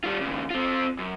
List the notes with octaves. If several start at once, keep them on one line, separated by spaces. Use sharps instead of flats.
G3 F4
D#2 C#3
C4 F4
F#2